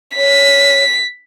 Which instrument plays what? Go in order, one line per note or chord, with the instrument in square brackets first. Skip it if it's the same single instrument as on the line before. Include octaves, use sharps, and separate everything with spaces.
[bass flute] C#5 [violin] B6